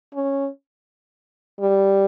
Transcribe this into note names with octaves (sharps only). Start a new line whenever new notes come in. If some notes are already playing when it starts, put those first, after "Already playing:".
C#4
G3